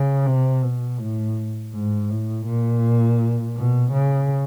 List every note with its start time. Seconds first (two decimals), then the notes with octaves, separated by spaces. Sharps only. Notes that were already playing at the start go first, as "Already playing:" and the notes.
Already playing: C#3
0.26 C3
0.63 B2
0.99 A2
1.73 G#2
2.10 A2
2.46 A#2
3.56 B2
3.93 C#3